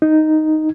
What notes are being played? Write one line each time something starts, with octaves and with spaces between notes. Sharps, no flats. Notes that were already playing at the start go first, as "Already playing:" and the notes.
D#4